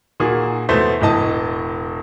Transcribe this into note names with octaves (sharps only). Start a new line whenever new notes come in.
A#2 D#3 A#3 F#4 G#4
E2 B2 G#3 A3 C5 B6
E1 A2 E3 D#5 A5